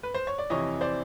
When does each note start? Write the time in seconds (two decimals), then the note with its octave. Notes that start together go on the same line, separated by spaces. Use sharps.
0.03 B4
0.14 C5
0.27 C#5
0.38 D5
0.50 F2 C3 E3 C#5 D#5
0.81 C5 D5